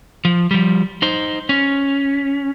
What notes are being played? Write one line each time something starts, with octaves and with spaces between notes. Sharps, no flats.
F3
F3 G3
D#4 C5
C#4